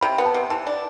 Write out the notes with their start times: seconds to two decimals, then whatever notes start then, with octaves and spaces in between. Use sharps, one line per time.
0.01 C3 B5
0.18 B3
0.26 A5
0.34 C3
0.50 E3 A5
0.67 D4